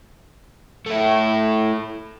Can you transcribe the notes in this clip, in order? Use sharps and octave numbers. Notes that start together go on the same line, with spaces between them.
A3 E4